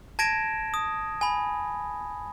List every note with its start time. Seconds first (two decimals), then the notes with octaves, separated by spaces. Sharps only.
0.19 A5 G#6 A#6 D7 E7
0.74 D#6
1.21 G#5 B5